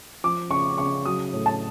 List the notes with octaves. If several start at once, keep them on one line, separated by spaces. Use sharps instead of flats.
F3 D6
C#3 C#6
C#3 C#6
F#3 D#6
A2
A5